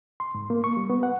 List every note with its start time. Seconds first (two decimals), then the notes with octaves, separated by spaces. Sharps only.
0.20 C6
0.35 G#2
0.50 A#3
0.64 C#6
0.77 G3
0.90 B3
1.03 F#5